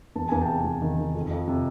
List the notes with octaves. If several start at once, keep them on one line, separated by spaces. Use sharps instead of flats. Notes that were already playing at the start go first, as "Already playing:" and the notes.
E2 A5
E2 G#5
G5 A5
C3
E2
D#3
D#3
F2
F2
C3